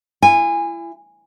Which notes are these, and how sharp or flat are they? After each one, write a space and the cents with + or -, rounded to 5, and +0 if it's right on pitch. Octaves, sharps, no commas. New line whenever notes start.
E4 +35 G#5 -20